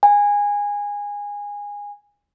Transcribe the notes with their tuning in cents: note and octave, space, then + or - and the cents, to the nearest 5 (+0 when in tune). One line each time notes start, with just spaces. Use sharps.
G#5 -20